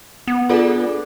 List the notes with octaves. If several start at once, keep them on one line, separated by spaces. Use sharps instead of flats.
B3
D4 F4 G#4 A4 B4 D5